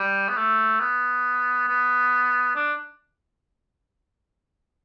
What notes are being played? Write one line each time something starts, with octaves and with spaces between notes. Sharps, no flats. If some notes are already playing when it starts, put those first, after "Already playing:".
Already playing: G3
B3
A3
B3
B3
D4